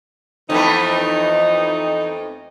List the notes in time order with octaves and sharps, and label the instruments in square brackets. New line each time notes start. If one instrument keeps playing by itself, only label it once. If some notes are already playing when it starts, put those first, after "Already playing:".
[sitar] F2 A3 B3 [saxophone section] E3 D#4